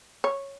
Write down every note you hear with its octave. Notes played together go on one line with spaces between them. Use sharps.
C#5